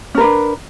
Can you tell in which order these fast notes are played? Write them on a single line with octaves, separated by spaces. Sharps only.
C#4 A#4 B4 D4